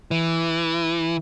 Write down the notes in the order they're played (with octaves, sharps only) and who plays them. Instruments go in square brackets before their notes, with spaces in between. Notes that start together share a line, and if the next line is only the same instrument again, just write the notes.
[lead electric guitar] E3